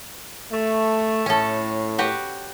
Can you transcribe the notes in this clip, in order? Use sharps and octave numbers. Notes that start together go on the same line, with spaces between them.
A3
A2 C#4 A4
F#4 G4 B4